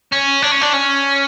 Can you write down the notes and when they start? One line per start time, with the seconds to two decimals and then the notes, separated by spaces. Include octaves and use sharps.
0.12 C#4
0.42 D4
0.52 C#4
0.61 D4
0.73 C#4